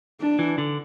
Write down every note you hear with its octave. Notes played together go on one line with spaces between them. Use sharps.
D4
E3
D3